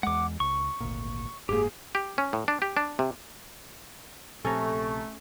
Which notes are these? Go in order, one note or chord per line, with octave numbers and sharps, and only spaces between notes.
E2 G#3 F#5 D6
C#2 C#6
G#1 D2 A#2
F#1 G#2 A#3 G4 G#4
G4
C#4
A2
D4
G4
D4
C3
A#1 C3 A3 C#4 A4 A#5 C#6